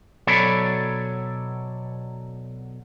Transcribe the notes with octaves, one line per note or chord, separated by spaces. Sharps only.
B2 F#3 A4 C#5 D5 B5